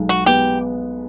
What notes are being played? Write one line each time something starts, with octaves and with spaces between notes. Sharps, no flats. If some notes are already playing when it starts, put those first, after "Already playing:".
Already playing: B1 G#3
F#4
B3 G4